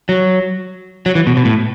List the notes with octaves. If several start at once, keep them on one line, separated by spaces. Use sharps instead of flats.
F#3
F#3
E3
B2
B2
A2